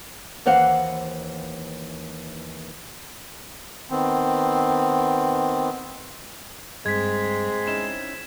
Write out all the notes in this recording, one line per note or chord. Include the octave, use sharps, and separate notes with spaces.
D#2 E3 C5 F5 F#5
D#3 B3 C4
G2 G#3 C4 G#6 B6
C#4 D#4 E4 E7